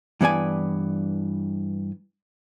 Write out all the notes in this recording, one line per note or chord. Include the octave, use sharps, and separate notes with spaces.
G2 E3 B3 D5 G#5